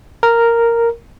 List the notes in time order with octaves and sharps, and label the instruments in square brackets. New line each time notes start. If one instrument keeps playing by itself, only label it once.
[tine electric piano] A#4